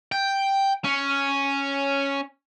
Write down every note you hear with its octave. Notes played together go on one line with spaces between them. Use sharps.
G5
C#4